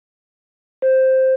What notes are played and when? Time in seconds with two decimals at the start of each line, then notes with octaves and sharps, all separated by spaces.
0.82 C5